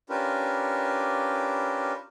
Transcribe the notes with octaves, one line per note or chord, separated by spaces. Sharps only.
C#4 D4 F4 G4 A#4 B4